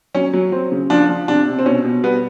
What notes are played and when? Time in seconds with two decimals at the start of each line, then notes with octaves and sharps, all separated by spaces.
0.15 F#3 C#4
0.33 F#3
0.52 F#3 C4
0.72 C#3
0.90 F3 D4
1.09 F3
1.28 C3 D4
1.47 C3
1.59 C4
1.66 B2 C#4
1.85 B2
2.04 G3 B3